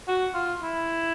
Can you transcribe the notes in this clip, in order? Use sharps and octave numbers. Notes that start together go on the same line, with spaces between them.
F#4
F4
E4